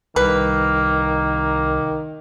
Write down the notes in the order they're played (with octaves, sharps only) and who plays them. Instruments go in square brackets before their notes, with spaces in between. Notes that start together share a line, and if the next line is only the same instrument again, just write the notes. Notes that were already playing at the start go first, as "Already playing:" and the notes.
[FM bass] C2 [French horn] D#3 [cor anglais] A#3 [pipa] B4